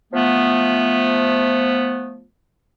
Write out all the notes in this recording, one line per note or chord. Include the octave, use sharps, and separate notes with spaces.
F3 A3 B3